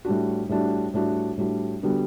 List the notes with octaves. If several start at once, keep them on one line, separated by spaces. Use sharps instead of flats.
A2 G3 D4 F#4
A2 G3 D4 F#4
A2 G3 D4 F#4
A2 G3 D4 F#4
D3 G3 B3 F#4